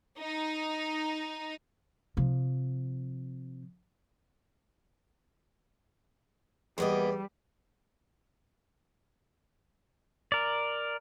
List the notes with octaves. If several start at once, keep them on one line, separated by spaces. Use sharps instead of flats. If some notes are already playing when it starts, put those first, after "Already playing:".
D#4
C3 F3
E2 G3 A#3 B3 D#5
A#4 D5